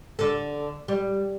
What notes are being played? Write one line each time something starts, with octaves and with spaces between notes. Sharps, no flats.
D3 A4
G3